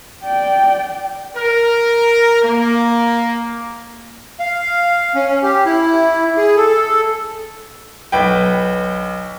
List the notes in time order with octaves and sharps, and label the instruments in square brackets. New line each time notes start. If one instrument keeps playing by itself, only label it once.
[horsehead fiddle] D5 G5
[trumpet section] A#4
A#3
[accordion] F5
C#4
G4
E4
G#4
A4
[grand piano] B1 B4 G5